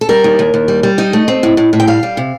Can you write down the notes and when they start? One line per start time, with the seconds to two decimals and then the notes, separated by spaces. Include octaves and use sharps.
0.01 A4
0.09 G3 A#4
0.24 D#2
0.39 D#2
0.54 D#2
0.68 G3
0.83 G3
0.98 D#4 D#5
1.13 A3
1.28 C4
1.43 A2
1.57 A2
1.73 A2
1.80 G5
1.87 G3 F5
2.03 G3
2.17 C3